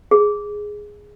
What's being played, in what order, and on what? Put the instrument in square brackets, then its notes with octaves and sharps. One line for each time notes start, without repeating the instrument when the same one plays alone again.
[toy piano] G#4